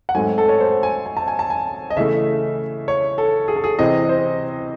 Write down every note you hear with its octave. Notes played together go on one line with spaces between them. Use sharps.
F#5
G#2 F#3 A3 C4 G#5
A4
C#5
C5
G#5
G#5
A5
G#5
A5
G#5
D#5
C#3 E3 A3 E5
C#5
A4
G#4
A4
G#4
C3 E3 C4 D#5
C5